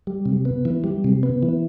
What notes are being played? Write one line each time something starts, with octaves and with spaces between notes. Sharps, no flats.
G3
C3
B3
E3
G3
C3
B3
E3